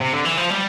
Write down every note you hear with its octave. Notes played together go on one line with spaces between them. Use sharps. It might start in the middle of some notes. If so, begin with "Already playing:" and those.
C3
D3
E3
F3
G3